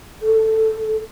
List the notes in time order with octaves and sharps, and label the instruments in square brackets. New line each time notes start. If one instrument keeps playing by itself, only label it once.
[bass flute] A4